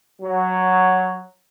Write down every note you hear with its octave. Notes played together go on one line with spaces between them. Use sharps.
F#3